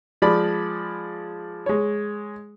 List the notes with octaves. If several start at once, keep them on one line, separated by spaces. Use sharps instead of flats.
F3 G#3 D5 B5
G#3 C#5